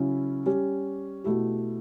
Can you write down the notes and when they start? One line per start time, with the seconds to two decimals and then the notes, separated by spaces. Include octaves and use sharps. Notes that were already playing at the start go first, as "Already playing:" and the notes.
Already playing: C#3 F#3 C#4 E4
0.46 G3 C#4 G4
1.24 B2 A3 E4 G4